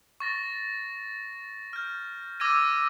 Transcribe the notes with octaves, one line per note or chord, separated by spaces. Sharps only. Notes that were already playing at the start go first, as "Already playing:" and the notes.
C#6 A6 A#6
F6 G6
D6 E6 G#6 A#6 D#7